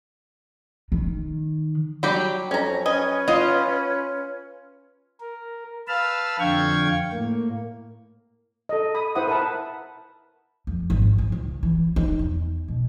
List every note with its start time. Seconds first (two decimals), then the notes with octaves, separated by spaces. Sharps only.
0.92 D#3
2.03 F#3 G3 G4 B5
2.51 F2 C#4 A#5
2.86 C#4 B4 D#5 G#5
3.28 F4 D#5 F5 F#5
5.20 A#4
5.88 B4 F5 A5 B5 E6 F6
6.40 F2 D3 F5 G5 C#6 G#6
7.13 A2 A#3
8.69 A4 D#5
8.95 B5 D#6
9.15 E4 B4 C5 E5 F#5 D#6
9.27 A#4 B4 E5 F#5 A5 B5
10.67 F2
10.90 G#1
11.18 A1
11.32 C#2
11.63 E3
11.96 D#4
12.19 E2
12.68 B2